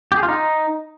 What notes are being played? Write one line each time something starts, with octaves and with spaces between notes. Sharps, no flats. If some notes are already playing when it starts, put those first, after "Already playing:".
G4
G#4
F4
D#4